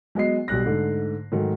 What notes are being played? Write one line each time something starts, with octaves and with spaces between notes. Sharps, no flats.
F#3 G#3 B3 D#5 C7
B1 G3 F#6 A#6
G#2 D3 A3
G#2 D#3 F#3 A3